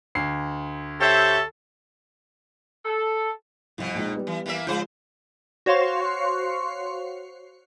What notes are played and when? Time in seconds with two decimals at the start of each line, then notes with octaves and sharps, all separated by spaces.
0.15 D2 C7
1.01 G4 A4 C5 C#5 E5
2.86 A4
3.78 C2 F2 B2
3.94 A#1 G#3 D#4
4.15 G3 B3
4.27 E3
4.46 E3 A#3 E5
4.67 C#3 F3 G#3 C5
5.66 F#4 C5 C#5 F5 C6 C#6